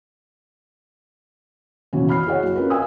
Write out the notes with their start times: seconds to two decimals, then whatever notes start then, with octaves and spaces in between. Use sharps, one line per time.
1.93 B2 E3 F#3 C#4
2.09 B5 F6 C7
2.26 E4 F#4 G#4 C#5 D#5 F#5
2.43 F#3
2.56 C#4 F4 A#4 B4
2.70 D#5 F5 G#5 D#6 E6